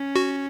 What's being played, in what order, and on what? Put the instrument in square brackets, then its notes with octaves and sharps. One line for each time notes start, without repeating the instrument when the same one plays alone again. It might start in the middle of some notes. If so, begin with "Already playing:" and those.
Already playing: [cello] C#4
[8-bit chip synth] F#4